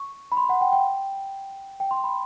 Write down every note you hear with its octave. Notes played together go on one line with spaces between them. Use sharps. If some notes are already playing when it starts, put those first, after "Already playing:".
Already playing: C#6
B5
C6
F#5
G5
G5
G5
C6
B5